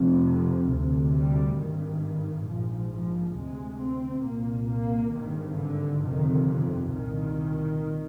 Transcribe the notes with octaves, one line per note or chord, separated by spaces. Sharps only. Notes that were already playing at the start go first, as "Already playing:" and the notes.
Already playing: F1 F2 C3
D2 C3
G3
G#1 G2 D#3
A#1 G#2 F3
F3
D2 C3 G#3
C4
C2 A#2 A#3
A#3
G#1 G2 D#3
D3
G1 F2 C3 D#3
C2 A#2 D#3